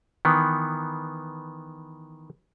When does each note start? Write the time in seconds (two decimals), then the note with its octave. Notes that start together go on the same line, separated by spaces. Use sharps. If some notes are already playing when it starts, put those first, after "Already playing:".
0.25 D#3 E3 B3